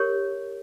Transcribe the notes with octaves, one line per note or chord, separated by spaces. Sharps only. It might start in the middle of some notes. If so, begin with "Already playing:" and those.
Already playing: G4 A#4 C#5